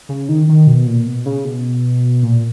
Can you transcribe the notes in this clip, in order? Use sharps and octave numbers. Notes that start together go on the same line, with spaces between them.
C#3
D#3
D#3
B2
A#2
B2
C#3
B2
A#2